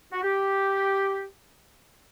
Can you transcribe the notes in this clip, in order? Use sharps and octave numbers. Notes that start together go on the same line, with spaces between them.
F#4
G4